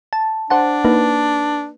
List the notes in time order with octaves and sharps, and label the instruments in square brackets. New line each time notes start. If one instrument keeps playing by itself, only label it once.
[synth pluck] A5
[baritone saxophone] D4 [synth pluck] C5 F#5 A5
[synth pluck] A#3 D#4 B4